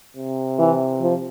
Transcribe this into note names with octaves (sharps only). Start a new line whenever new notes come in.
C3
E3
F3